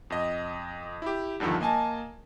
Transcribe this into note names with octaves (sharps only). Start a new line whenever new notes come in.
F2 D#5
E4 G4
E2 G2 D3 D#3 F3
A#3 D#5 G#5 A5